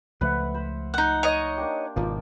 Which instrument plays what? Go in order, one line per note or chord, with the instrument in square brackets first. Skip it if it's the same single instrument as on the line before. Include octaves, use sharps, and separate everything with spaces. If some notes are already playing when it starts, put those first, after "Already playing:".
[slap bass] C#2 F3 A3 [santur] B4 E5 F#5
[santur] C5 B5
[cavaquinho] D#4 F#5 [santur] C5
[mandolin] C#5 D#5
[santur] A#3 D4 G4
[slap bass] G#1 B2 [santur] F3 A#3 D5